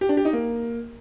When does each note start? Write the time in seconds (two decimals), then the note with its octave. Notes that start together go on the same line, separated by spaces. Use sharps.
0.01 G4
0.09 D4
0.17 G4
0.25 D#4
0.33 A#3